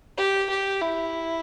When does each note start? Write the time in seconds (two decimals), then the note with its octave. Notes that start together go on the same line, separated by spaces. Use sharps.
0.17 G4
0.50 G4
0.81 E4